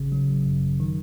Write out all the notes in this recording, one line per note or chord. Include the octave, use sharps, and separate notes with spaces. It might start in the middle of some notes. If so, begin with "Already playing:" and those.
Already playing: G#1 C#3
F#3
F#2
D#3